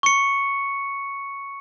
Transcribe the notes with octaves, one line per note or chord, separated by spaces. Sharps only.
C#6 C#7